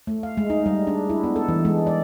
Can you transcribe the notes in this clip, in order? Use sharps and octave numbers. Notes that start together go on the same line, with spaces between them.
A3
F5
G#3
D#4
G3
D4
E4
B3
A4
E3
G#3
D5